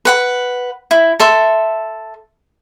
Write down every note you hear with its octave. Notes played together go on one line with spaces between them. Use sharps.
B4 F#5 B5
E4
A4 E5 C6